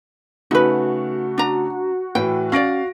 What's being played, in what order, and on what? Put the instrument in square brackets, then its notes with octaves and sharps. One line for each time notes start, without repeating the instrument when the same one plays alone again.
[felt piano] C#3 A3 [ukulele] D#4 B4 [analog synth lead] F#4
[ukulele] D4 A#5
[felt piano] A2 E3 B4 [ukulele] G5
[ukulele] C#4 D5 [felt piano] F5 A#6 D7